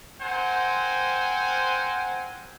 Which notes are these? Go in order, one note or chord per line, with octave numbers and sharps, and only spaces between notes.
C4 A#4 C5 F#5 G#5